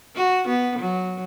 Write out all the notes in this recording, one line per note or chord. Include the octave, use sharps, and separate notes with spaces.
F#4
B3
F#3